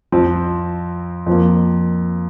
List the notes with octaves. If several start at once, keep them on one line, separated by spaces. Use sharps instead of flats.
F2 F3 C4
F2 F3 A#3